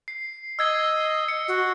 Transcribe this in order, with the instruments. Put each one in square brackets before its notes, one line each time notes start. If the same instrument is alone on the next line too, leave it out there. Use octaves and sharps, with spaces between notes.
[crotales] C7
[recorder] D#5 [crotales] E6 G#6 C7
[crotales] C#7
[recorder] F#4